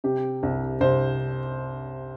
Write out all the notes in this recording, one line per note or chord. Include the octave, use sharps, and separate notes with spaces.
C3 G4
C2
C2 C5